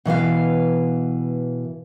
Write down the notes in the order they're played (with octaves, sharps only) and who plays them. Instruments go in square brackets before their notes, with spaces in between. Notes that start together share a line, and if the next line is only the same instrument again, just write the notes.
[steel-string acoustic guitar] B2 E3 B4 F5